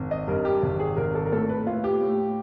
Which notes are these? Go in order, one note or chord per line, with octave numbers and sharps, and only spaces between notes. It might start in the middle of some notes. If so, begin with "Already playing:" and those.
Already playing: G#1
D#5
G2 A#4
G4
G#1
G#4
G#1 A#4
A4
A#4
A2 A4
B4
A2 F4
G4
A2